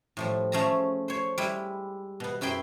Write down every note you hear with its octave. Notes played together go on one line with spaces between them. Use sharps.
A2 F3 G3
F3 A3 C#4 G#4 A5 A#5
C5 C#5
G3 G#3 E4 B5
B2 B3
F#2 E4 G#4 G5 B5 C6